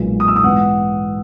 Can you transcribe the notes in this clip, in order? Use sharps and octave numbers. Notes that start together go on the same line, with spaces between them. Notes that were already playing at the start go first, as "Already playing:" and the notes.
Already playing: B1 A#2 G#3 B3
D#6
E6
D#6
G#2 E3 B3 F#5